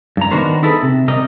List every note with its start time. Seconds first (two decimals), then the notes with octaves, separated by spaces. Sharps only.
0.17 G2 A#5
0.31 D#3 B3 D4 F#4 A#4 C5
0.63 D#4 E4 G#4 A4 B4
0.83 C3
1.08 C3 G3 A#4 D#5